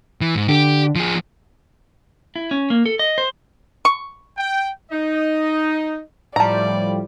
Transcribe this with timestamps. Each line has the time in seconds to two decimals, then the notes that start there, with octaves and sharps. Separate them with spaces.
0.21 E3
0.35 G#2
0.49 D3 G4
0.96 F3 G#4
2.36 E4
2.51 C#4
2.70 A#3
2.86 A4
2.99 D#5
3.18 C5
3.85 C#6
4.37 G5
4.91 D#4 D#5
6.36 A2 F3 G3 D5 A5 A#5